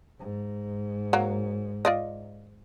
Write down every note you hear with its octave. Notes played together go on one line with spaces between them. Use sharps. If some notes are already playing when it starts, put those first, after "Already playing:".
G#2
F#3 A#3
F4 D5 D#5